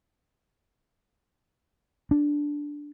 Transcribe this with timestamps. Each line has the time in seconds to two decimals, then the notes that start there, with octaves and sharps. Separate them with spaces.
2.11 D4